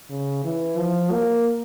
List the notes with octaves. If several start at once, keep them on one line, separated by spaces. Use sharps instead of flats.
C#3
E3
F3
A#3